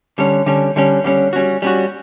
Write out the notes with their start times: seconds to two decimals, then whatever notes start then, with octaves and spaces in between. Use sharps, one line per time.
0.18 D3 G3 C#4
0.46 D3 G3 C#4
0.76 D3 G3 C#4
1.04 D3 G3 C#4
1.33 G3 C#4 F#4
1.62 G3 C#4 F#4